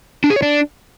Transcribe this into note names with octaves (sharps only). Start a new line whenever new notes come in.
D4
G#4
C#5
D4